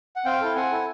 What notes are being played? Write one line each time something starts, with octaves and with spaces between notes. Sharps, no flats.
F#5
C4 F5 G5
E4 A4
C4 F#5 G#5
E4 A4